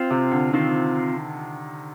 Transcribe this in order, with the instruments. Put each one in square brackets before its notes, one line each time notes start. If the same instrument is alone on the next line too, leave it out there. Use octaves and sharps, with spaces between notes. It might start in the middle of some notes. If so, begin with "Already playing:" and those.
Already playing: [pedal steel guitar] C4 F4 C5
[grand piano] C3
D3
[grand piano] D#3 [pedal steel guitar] C4 F4 C5